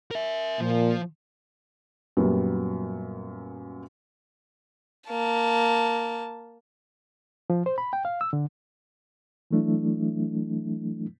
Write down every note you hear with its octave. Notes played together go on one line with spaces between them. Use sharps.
A#4 E5
A#2 F3
F#2 A#2 F#3 G3 B3
A#3 A5
F3
C5
B5
G5
F5
E6
D3
E3 F#3 A3 D4 E4